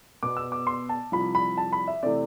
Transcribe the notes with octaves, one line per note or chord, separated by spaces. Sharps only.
B2 B3 D6
E6
D6
C6
A5
C2 C3 F3 B5
B5
A5
B5
E5
C3 E3 A3 C4 D5